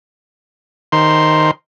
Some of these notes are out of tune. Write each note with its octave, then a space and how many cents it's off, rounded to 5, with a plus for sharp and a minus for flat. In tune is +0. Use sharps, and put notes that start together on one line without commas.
D#3 +0 C5 +0 C6 +0